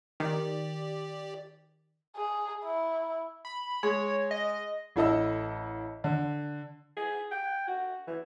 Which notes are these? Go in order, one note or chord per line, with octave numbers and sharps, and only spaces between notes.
D#3 G4 D5
G#4
E4
B5
G#3 C#5
D#5
A1 E4 A4 D#5 E6
D3
G#4
G5
F#4
E3